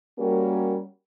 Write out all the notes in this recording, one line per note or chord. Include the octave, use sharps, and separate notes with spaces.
G3 A#3 C#4 F#4 G4 A#4